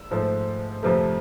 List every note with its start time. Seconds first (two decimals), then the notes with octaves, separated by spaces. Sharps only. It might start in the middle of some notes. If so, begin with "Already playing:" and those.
Already playing: E6
0.11 G#2 F3 A3
0.83 F2 C3 F3 A3